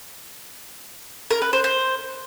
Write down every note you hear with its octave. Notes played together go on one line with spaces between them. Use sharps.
A#4
B4
C5
C5